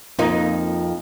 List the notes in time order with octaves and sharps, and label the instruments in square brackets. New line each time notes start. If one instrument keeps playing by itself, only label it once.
[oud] F2 A#3 D#4 [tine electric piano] C4 F4